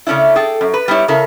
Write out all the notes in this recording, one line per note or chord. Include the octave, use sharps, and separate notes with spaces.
C#3 A3 C#4 D4 E4
G#4 A4 G5
F#2
B4
G3 B3 D4 E4 C#5
C#3 E4 A4 A#4